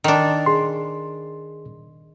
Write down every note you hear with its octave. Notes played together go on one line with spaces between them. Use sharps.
D#3 D4
G#4 C6